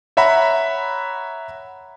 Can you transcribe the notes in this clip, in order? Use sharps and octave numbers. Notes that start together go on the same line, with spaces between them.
C#5 E5 F#5 A#5 B5